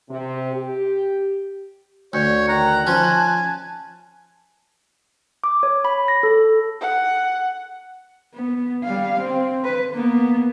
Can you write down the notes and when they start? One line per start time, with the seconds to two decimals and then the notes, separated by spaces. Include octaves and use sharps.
0.10 C3
0.53 G4
2.13 D2 C#5 G6
2.48 D#3 A#5 F#6
2.87 F3 C#4 G#5 A5
5.44 D6
5.63 C#5
5.85 B5
6.08 A#6
6.23 A4
6.81 F#5
8.34 B3
8.84 G3 F5
9.20 C4
9.65 B4
9.94 A#3 B3